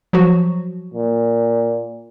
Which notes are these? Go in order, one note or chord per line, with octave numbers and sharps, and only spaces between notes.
F3 F#3 F#4
A#2